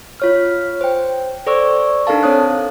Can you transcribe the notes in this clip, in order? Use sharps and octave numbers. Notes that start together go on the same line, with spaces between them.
F4 C#5 F6
C5 G5
A4 C5 D5 C#6 E6
D4 D#4 A4 A#4 F5 A5
C4 C#5 D#6 F#6